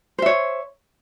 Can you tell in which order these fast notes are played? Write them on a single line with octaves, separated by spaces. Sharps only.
C5 E5 C#5